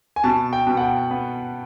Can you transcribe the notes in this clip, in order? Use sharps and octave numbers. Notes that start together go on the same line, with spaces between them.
G#5
B2 A5
G5
B2
F#5
G5
B3